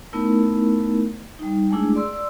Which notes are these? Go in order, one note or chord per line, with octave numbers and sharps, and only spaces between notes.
A3 B3 D#4 E4 A#4
G3 D#4
G#3 A3 D4 E4 G#4
D5 C6 E6